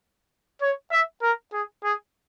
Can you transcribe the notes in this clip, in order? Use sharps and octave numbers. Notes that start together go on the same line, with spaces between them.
C#5
E5
A#4
G#4
G#4